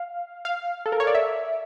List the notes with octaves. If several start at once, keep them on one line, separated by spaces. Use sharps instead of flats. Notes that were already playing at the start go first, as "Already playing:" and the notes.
Already playing: F5
F5
A4
A#4
C#5
D5
E5